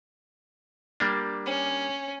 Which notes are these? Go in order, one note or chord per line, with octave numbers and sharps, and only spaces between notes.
G3 A#3 D4
C#4